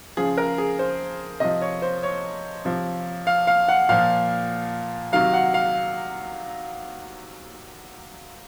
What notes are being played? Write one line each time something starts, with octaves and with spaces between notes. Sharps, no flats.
C#3 F3 G#4
A#4
G#4
C5
C3 F3 D#5
C#5
C5
C#5
C3 F3
F5
F5
F#5
A#2 F3 F5
C3 D#3 F#3 F5
F#5
F5